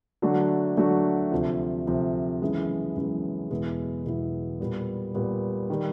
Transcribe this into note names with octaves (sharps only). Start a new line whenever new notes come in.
D3 F#3 A3 D4 F#4
D3 F#3 A3 D4 F#4
D2 C3 F3
D2 C3 F3
F#2 C#3 E3 G#3 B3
F#2 C#3 E3 G#3 B3
E2 B2 G#3 B3 E4
E2 B2 G#3 B3 E4
A#2 G3 B3
A#2 G3 B3
D#3 G3